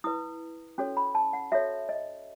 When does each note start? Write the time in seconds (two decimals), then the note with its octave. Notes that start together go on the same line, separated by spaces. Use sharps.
0.04 E4 B4 D#6
0.78 C#4 F#4 A4 C#5
0.97 B5
1.15 A5
1.33 F#5
1.52 F#4 A4 C#5 E5
1.89 D#5